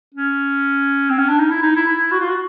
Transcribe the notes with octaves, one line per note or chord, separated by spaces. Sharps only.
C#4
C4
C#4
D4
D#4
E4
D#4
E4
E4
F#4
F4
F#4